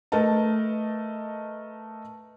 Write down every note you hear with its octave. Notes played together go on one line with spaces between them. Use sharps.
A3 A#4 B4 D#5 A5